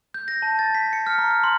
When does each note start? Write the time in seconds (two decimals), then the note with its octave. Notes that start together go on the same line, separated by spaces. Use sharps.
0.14 G6
0.28 A#6
0.42 A5
0.59 A6
0.75 B6
0.93 C#7
1.07 F6
1.18 A#5
1.31 F6
1.44 C6